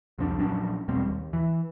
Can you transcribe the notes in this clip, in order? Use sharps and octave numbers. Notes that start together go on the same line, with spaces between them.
C2 F2 C4 D4
A#1 F#3 C#4 D4
E1 B2 G3 C4
D#2
E3